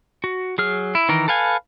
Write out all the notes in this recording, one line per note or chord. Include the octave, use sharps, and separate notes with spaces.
F#4
F#3 G#4 F6
E4
D#3 E3 A#4
A4 B4 F5 G#5